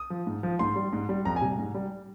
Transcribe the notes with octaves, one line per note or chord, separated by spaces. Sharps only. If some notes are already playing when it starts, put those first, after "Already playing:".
Already playing: D#6
F3
G#2
F3
G#2 C6
G3
G#2
G3
F2 A#5
G#5
C3 G3
G#2
G3